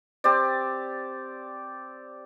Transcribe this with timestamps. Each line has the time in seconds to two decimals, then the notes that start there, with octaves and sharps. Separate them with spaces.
0.24 C4 G4 C5 D5